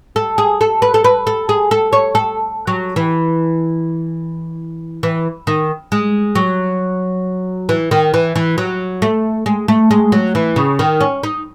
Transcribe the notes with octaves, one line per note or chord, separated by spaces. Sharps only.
A4
G#4
A4
B4
A4
B4
A4
G#4
A4
C#5
A4
F#3
E3
E3
D#3
G#3
F#3
E3
D#3
E3
E3
F#3
A3
G#3
A3
G#3
F#3
E3
C#3
D#3
C#4
D#4